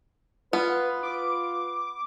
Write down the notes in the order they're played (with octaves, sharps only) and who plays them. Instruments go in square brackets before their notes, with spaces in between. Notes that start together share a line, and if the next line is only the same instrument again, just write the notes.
[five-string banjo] B3 [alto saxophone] F4 [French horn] B4
[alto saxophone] F4 [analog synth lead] D6